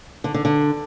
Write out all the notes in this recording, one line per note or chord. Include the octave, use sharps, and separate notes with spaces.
D3
D3
D3